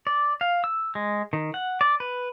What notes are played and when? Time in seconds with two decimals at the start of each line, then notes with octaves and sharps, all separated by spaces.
0.07 D5
0.41 F5
0.64 E6
0.95 G#3
1.33 D#3
1.54 F#5
1.81 D5
2.00 B4